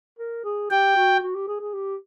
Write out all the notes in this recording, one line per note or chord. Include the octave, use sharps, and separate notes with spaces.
A#4
G#4
G4 G5
F#4
F#4
G4
G#4
G#4
G4